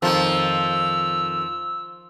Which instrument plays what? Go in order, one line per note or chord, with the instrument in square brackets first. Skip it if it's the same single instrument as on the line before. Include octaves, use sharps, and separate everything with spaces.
[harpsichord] F2 D#3 D#4 [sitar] F3 [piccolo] E6